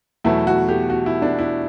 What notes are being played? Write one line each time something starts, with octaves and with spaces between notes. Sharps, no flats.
E2 B2 F#3 A3 E4
F#4
G4
F#4
E4
D4
E4